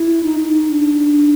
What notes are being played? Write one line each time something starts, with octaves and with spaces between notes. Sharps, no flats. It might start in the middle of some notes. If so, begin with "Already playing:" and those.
Already playing: E4
D#4
D#4
D#4
D4